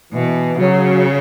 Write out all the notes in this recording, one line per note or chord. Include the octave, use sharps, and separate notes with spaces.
B2 E3
C#3 F#3